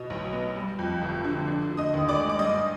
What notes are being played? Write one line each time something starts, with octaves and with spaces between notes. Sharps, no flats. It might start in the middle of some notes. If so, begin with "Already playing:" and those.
Already playing: B2 D#5
B1
B3
G3
F2
F1
D3
D4
D3
D#5 D#6
D#2
D5 D6
G#3
D6
G2 D#5 D#6